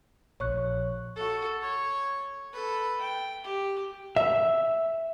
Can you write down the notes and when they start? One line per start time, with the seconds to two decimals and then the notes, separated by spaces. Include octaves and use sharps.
0.40 A#1 C#5 C#6 F#6
1.16 F#4 A4
1.62 C#5
2.52 A4 B4
3.01 G5
3.44 G4
4.16 E5